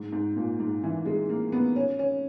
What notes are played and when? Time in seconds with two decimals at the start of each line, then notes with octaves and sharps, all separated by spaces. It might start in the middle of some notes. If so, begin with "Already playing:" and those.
Already playing: G#2
0.12 G#2
0.36 A#2
0.60 G#2
0.83 E3
1.06 G#3
1.29 A#3
1.52 B3
1.76 C#4
1.99 C#4